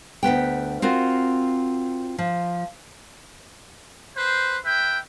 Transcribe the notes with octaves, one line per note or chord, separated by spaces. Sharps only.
D2 G2 B3 G5
C4 F4 F#4 A#4
F3
B4 C5
B4 E5 G5